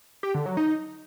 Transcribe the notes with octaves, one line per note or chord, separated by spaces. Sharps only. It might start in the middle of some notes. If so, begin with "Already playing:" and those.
G4
D3
F#3
D#4